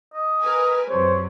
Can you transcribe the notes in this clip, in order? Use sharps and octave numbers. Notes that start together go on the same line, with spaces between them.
D#5
A#4 B4 G#5
F#2 C3 C5 C#5